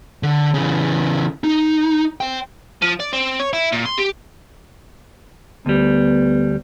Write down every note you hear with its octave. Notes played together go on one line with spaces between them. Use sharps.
D3
C#3 E3
D#4
C5 G5
F3
D5
C4
C#5
E4
A#2
C6
G4
D2 G3 B3